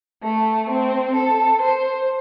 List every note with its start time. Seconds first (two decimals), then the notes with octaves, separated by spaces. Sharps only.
0.23 A3
0.69 C4
1.15 A4
1.61 C5